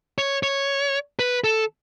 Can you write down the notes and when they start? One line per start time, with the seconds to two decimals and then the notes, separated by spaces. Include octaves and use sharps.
0.18 C#5
0.43 C#5
1.19 B4
1.44 A4